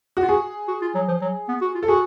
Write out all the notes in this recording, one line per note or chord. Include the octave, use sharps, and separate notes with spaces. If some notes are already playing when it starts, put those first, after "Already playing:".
F#4
F4
F#4 G#4
F#4
F4
F#3
F3
F#3
B3
F#4
F4
A4
F#4 G#4